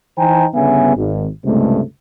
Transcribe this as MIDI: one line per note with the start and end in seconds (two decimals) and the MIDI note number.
0.18 0.45 52
0.18 0.45 63
0.18 0.45 72
0.18 0.45 79
0.18 0.45 80
0.18 0.45 82
0.54 0.95 31
0.54 0.95 43
0.54 0.95 49
0.54 0.95 59
0.54 0.95 76
0.54 0.95 80
0.96 1.26 32
1.44 1.81 37
1.44 1.81 43
1.44 1.81 48
1.44 1.81 56
1.44 1.81 57